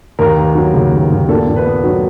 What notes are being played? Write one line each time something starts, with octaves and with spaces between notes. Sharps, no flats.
D#2 A#4
D#2
F#3
C#3
D#2
D#2
A#2 A4
A#2
B4
B3
F#3